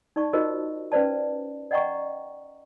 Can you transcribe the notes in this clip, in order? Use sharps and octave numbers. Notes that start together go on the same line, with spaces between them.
D#4 D5 A5 C#6
D#4 F4 F#4 A#4 C5 D#5
C#4 B4 C5 D5 A5
D5 D#5 F#5 G5 A#5 C#6